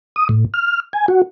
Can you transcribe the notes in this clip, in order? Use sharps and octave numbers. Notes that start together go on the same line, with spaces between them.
D#6
A2
F6
G#5
F#4